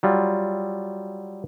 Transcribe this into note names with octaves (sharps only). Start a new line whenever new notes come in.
F#3 G3 F4